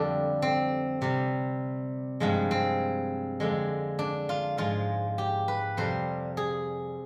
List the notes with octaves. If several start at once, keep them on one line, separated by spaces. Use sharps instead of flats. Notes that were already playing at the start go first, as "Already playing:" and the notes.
Already playing: F2 D3 G3 D4
C4
C3 G3
G2 F3 G#3
C4
F2 D3 G#3
D4
F4
G#2 F3 G#3 F4
G4
B4
F2 C3 G3 C5
G#4